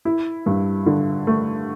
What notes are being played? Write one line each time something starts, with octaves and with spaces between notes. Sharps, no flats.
E4
G2
D3
A3